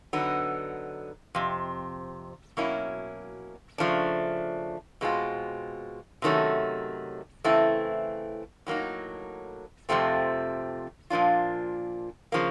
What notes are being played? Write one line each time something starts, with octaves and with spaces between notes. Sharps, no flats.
D3 F#3 B3 D#4
F2 C3
B2 F#3 A#3 C#4 E4
C#3 F3 A3 D4
B2 G#3 C4 F4
C3 D#3 F#3 A3 C#4
C#3 E3 A3 C4 E4
A2 F#3 A#3 D#4
F2 C3 F3 A3 C4
A#2 F3 A#3 D4 F4
C#3 F3 A#3